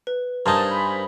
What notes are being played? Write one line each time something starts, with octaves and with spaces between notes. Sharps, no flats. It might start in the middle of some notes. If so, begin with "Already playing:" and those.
B4
G2 D#4 A#4 C5 G#5 A5
B5